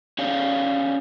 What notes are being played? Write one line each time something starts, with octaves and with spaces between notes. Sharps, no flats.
C#4 G4 C#5 D5 F5